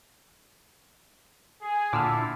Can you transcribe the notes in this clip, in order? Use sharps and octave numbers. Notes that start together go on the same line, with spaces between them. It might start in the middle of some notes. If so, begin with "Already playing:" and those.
G#4
A#2 D3 E4 F4 D6 E6 F6